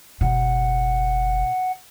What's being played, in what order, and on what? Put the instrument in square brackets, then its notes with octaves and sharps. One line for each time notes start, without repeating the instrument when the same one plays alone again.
[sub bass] F#1 [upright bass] B2 [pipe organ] F#5